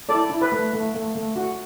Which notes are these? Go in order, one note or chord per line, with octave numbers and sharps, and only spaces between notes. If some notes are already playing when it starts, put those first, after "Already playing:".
E4 A4 D5
E4
B4
A3
A3
A3
A3
F#4